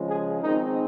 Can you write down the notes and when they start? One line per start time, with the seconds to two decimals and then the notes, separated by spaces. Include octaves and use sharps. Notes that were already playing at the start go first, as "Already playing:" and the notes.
Already playing: C#3 F3 G#3
0.08 G#4
0.42 D#3 G#3 C4 D#4